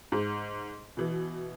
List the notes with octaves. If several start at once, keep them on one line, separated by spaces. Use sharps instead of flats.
G#2
B2 E3